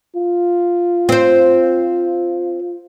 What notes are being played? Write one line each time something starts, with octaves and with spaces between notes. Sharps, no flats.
F4
C4 C5